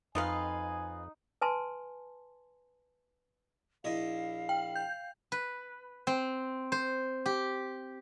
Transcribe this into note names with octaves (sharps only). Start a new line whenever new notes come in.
F2 D#4 F4 B4 D#5 F5 G#5
B4 G#5 A5 C6
A#1 E4 D#5 F5
G5
G6
B4
C4
C5
G4